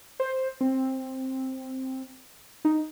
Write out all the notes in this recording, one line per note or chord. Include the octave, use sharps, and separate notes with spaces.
C5
C4
D#4